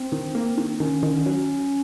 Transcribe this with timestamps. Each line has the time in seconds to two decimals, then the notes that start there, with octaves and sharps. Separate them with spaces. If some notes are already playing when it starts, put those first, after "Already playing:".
Already playing: C4
0.12 D#3
0.35 A#3
0.57 D#3
0.80 D#3 C#4
1.03 D#3
1.26 F#3